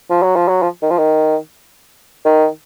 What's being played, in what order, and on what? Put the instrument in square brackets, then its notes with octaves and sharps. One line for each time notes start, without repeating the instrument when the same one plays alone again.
[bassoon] F3
F#3
F3
F#3
F3
D#3
F3
D#3
D#3